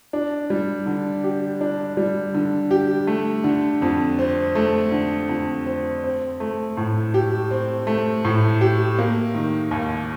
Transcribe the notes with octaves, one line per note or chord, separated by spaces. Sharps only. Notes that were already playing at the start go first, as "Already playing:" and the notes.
D4
G3
D3
G4
D4
G3
D3
G4
A3
D3
F2
C4
A3
D3
F2
C4
C4
A3
A2
G4
C4
A3
A2
G4
A#3
D#3
D#2